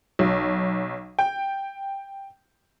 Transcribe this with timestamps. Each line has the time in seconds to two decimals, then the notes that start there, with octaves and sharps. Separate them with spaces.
0.19 B1
1.19 G5